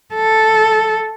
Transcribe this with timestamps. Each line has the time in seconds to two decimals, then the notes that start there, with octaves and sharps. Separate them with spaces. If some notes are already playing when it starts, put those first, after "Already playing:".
0.15 A4